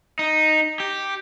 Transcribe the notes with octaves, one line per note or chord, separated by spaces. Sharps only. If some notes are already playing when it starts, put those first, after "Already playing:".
D#4
G4